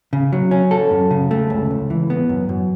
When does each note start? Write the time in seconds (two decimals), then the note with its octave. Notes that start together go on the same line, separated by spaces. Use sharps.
0.13 C#3
0.32 F#3
0.51 C#4
0.71 A4
0.91 F#2
1.11 C#3
1.31 A3
1.50 C#2
1.71 C#2
1.90 E3
2.10 B3
2.29 F#2
2.49 F#2